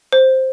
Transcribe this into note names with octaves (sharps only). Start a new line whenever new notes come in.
C5